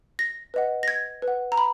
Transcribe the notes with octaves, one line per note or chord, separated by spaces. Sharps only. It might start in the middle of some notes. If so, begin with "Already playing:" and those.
A#6
B4 D#5 F#5
A#6
G#6
B4
F#5
A#5
B5